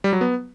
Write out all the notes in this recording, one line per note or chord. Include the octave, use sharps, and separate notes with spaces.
G3
F#3
B3